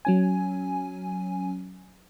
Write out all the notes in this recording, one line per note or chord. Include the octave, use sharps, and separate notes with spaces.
F#3 C#4 G#5